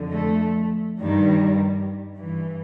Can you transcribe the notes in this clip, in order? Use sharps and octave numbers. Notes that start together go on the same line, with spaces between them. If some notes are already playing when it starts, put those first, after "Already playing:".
Already playing: F2 D3
A3
G2 D#3 G3
G2 E3